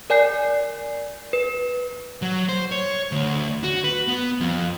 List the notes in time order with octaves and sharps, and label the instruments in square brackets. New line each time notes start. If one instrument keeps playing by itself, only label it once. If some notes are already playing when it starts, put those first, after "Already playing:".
[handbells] A#4 D5 G#5 G6 C7
B4
[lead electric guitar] F#3
C5
C#5
D2
F#4
B4
B3
F2